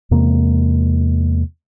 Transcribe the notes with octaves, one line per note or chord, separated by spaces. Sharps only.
E2 C3 G#3 A#3